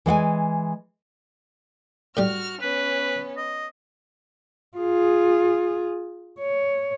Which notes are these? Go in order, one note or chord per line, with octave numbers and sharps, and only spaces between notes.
E3 G#3 F#5 G#5
A2 G3 F#4 F6
B3 C#4 B4
D#5
F4 G#4
C#5